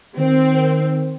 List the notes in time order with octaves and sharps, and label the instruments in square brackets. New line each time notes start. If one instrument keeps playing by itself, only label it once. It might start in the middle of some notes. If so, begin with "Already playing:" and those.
[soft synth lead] D#3 [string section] C4